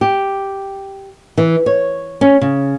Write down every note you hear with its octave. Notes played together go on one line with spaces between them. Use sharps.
G4
E3
C#5
C#4
C#3